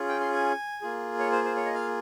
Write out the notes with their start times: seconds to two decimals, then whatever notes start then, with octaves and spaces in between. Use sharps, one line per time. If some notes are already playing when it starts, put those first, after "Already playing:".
Already playing: C#4 F4 G#4
0.09 G5
0.20 C6
0.32 G#5
0.82 A#3 F4 G#4
1.19 C#5
1.32 C5
1.44 C5
1.56 C#5
1.65 D#5
1.74 F5